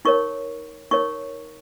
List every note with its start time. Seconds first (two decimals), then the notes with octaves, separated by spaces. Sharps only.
0.05 D#4 A#4 C#5 C#6
0.91 D#4 A#4 C#5 C#6